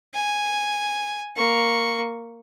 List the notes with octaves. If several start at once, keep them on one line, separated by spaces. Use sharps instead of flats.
G#5
A#3 C#6